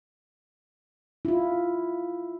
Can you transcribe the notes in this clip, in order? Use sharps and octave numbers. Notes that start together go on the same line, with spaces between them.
E4 F4